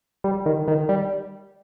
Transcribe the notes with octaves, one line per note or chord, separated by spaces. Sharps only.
G3
D#3
D#3
G3